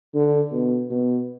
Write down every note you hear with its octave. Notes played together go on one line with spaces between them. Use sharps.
D3
B2
B2